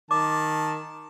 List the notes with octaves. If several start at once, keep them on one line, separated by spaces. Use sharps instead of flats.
D#3 A5 D6